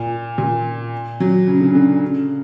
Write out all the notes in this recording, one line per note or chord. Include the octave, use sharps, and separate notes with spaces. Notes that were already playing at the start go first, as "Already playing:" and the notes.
Already playing: A#2
A#2
F#3
C#3
D3
D3
C#3